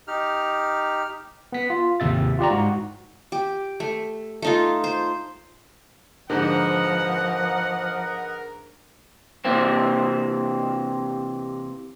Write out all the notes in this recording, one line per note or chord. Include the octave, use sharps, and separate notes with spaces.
D#4 G4 F6
B3 B6
F4
G#1 D#2 C3 E5 A6
F4 G4 D5 A#5
G#2 F#4
G4
A3
A3 D#4 F4
C5
G#2 D3 F3 A#4 B4 D#5 F#5
C3 E3 A#3 C4